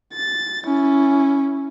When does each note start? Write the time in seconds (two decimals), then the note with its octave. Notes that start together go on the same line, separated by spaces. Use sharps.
0.14 A6
0.66 C#4 E4